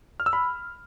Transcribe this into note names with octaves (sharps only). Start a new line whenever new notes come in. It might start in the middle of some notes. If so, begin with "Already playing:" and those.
F6
E6
B5